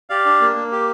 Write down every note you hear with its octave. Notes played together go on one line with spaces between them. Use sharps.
G4 D5 F5
D4
A#3
A#3
G4